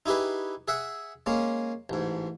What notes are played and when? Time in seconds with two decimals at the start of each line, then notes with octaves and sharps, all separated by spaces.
0.06 D#4 E4 G4 G#4 B4
0.68 G#4 E5 F#5
1.26 G#3 A#3 C#4
1.90 A1 G#2